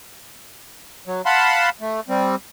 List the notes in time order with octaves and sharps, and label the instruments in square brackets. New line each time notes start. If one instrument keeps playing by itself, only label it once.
[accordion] F#3
F5 F#5 A5 B5 C6
A3
G3 C4